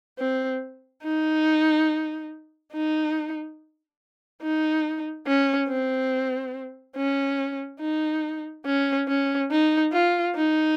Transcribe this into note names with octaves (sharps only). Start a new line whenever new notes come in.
C4
D#4
D#4
D#4
C#4
C4
C#4
D#4
C#4
C#4
D#4
F4
D#4